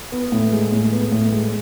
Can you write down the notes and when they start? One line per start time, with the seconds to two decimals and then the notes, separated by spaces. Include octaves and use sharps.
0.12 B3
0.32 A2
0.52 G#3
0.72 A2
0.92 B3
1.12 A2
1.32 G#3